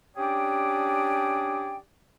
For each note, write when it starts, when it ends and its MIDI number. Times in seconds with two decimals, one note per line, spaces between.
0.16 1.76 61
0.16 1.76 62
0.16 1.76 67
0.16 1.76 68
0.16 1.76 74
0.16 1.76 79